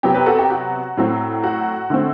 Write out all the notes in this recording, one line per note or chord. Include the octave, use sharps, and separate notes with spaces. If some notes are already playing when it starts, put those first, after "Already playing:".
C3 F#3 B3 G4
G4 B4
F#4 A4
G4
F#4
A2 F#3 C4
F#4
D3 A3 C4